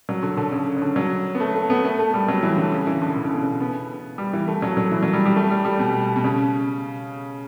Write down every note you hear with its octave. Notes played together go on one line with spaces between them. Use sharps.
F#3
D3
D3
C#3
C#3
D3
F#3
B3
A3
A3
B3
A3
A3
G3
F#3
E3
D3
C#3
E3
D3
D3
C#3
B2
C#3
B3
G3
E3
A3
F#3
F#3
E3
F#3
G3
G3
A3
G3
G3
B2
B2
C#3